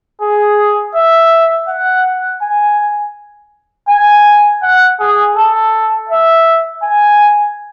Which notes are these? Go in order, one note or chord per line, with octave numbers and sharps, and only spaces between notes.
G#4
E5
F#5
G#5
G#5
F#5
G#4
A4
E5
G#5